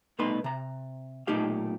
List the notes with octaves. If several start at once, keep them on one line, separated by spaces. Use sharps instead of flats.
C2 B2 A3 D#4 B4 C6
C3 A#5
B1 A#2 A3 D#4 G4 F5